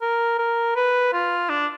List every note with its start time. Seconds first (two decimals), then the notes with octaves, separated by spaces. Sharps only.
0.02 A#4
0.39 A#4
0.76 B4
1.13 F4
1.50 D4